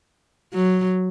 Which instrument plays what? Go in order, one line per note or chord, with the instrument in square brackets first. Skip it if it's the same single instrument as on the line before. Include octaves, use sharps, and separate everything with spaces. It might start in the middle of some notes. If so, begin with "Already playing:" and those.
[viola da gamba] F#3